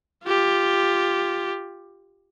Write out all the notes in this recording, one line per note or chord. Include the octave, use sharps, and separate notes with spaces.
F4 G4